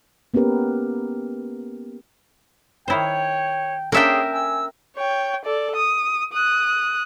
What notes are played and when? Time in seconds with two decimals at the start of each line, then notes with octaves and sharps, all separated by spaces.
0.34 A#3 B3 C#4 G4 A#4 B4
2.88 D#3 E4 C5 C#5 G5
3.92 A#3 C#4 D4 G#4 A#4 C#5 E5 G5
4.32 G#5 E6
4.96 C#5 G5
5.45 A4 D5
5.76 D#6
6.33 D#6 F#6